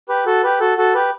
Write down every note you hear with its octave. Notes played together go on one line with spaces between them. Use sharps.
G4 B4
F#4 A4
G4 B4
F#4 A4
F#4 A4
G4 B4